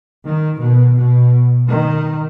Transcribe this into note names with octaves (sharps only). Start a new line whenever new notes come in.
D#3
B2
B2
D#3